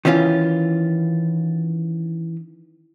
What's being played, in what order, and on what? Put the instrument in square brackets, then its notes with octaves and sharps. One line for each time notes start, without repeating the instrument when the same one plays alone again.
[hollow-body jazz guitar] D#3 E3 C#4 F4